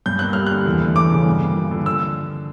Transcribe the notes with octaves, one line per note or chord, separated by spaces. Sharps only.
G2 G6
A#3 F#6
G3 F6
D3 F#6
E2
A3
E3 D6
C#3
G2
A#3
F3
D3
E6